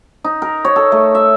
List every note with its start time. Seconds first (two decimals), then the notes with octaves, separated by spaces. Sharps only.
0.24 D#4
0.42 A#4
0.65 C#5
0.76 A4
0.92 A3
1.15 E5